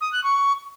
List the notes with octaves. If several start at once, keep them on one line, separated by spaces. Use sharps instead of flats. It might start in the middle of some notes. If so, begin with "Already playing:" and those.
D#6
F#6
C#6